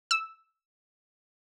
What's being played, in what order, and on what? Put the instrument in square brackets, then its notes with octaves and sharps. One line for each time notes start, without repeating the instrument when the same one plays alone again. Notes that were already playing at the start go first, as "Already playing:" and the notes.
[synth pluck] E6